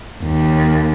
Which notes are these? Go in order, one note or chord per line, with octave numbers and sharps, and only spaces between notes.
D#2